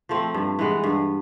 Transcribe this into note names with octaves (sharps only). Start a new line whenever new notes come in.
F3 A3 C4
G2
E3 G#3 B3
G2